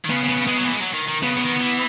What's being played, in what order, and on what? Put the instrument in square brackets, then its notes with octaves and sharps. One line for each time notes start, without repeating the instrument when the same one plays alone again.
[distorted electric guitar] D#3
[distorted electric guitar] C#3 [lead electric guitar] B3
[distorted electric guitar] C#3
[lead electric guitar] B3
[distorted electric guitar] C#3
[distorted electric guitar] G#3 [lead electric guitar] B3
[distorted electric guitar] F#3
E3
G#3
F#3
D#3
D#3
[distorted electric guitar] C#3 [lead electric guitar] B3
[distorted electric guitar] C#3
D#3
E3